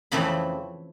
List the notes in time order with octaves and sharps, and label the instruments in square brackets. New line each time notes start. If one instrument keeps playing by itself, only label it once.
[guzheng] F2 C#3 E3 A3 C4 B5